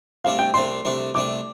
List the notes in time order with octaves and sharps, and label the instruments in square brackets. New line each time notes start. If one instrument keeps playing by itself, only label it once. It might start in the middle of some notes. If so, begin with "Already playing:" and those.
[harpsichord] C2 C3 A3 D4 [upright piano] F5
[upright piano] G5
[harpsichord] C2 C3 A3 D4 [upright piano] C6
[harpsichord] C2 C3 A3 D4
[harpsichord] C2 C3 A3 D4 [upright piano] D6